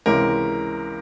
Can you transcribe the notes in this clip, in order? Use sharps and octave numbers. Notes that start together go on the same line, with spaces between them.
C#2 C3 E3 G#3 C#4 A#4